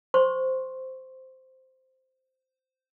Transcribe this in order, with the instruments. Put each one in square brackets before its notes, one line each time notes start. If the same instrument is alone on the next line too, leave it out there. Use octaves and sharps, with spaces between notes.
[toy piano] C5 C6 C#6